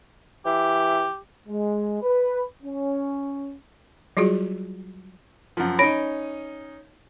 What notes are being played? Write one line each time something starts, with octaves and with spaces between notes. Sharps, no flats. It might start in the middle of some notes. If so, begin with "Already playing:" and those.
E3 G4
G#3
B4
C#4
F#3 G3 F4 F#4 G#4
F#2 F3
C#4 D#4 B5 A#6 D7